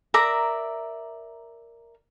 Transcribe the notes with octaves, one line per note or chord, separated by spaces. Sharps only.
A#4 D5 E5 A#5